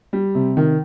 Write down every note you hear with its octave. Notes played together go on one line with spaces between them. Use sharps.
G3
C3
D#3